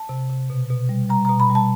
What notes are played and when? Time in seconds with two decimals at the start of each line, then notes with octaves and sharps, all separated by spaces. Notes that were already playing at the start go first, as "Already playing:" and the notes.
Already playing: A5
0.09 C3
0.30 C3
0.50 B2
0.70 B2
0.89 G3
1.10 G3 A#5
1.25 A#5
1.29 B2
1.40 B5
1.50 G3
1.55 A5